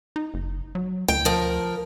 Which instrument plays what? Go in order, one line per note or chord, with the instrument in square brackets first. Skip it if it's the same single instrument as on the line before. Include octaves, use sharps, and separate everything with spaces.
[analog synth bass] D#4
F#1
F#3
[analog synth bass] D2 [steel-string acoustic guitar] G5
[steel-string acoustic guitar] F3 A#4